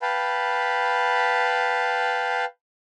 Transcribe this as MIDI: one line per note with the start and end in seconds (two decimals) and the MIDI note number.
0.02 2.45 71
0.02 2.45 77
0.02 2.45 79
0.02 2.45 81
0.02 2.45 83